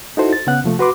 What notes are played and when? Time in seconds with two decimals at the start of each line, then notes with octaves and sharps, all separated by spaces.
0.17 D#4 E4 F#4 A4 C5
0.33 A6
0.47 C#3 B3 C#4 F#5 F#6
0.64 C3 F3 A3
0.79 F#4 B4 C6 D6